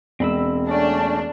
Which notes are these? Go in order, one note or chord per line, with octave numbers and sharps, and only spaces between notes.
E1 C4 B5 E6
A3 C#4 D4 D5 G5